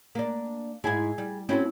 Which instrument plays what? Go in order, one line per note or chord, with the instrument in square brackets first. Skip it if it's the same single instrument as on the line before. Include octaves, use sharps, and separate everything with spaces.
[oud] A#3 D4
[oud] G#2 E4 [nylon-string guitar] G#4 G#5
[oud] G3
[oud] C4 E4 [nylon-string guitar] C#4 F#4 A4